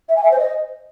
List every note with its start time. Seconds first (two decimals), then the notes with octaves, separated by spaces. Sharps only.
0.08 E5
0.16 G#5
0.23 E5
0.31 C5
0.38 D#5